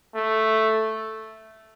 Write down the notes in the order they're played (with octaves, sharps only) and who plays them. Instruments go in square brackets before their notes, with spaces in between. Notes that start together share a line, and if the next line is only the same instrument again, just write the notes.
[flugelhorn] A3